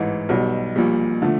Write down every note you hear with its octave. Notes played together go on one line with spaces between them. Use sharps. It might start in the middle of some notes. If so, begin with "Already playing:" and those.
Already playing: A1 G#2 E3
B1 B2 G3
A#1 A#2 G3
D3 F3 A3